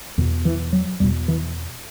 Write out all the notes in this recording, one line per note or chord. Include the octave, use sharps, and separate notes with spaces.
E2 B2 D3
E3
F#3
E2 B2 G3
E3